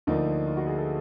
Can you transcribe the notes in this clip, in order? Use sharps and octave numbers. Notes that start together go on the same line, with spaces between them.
D2 D3 F3 A#3 D#4
F4
F#4
G#4
A4